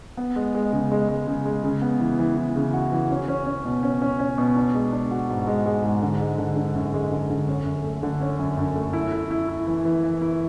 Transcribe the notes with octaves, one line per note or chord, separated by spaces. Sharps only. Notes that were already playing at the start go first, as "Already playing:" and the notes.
B3
G#3
G#3
C#3
G#3
G#3
C#3
G#3
C#3
B3
E3
E3
E3
C#3
F#4
E3
C#4
C#4
C#4
B2
C#4
C#4
C#4
B2
D4
G#3
D4
F#4
G#2
G#3
G#3
G#2
D3
G#3
D3
D3
F#2
G#3
D3
D3
C#4
F#2
A3
D3
C#4
F#2
F#2
A3
E4
E4
E4
E4
E3
E3
E3
E4